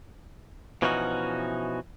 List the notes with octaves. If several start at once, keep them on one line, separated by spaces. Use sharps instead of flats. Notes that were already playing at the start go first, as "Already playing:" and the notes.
B2 E3 F3 C#4 D#4 F#4